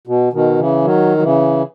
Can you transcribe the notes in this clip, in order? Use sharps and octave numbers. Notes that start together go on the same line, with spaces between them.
B2
B2 D#3
C#3 E3
D#3 F#3
F#3
C#3 E3